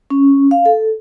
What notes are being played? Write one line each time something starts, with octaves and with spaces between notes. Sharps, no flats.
C#4
F5
A4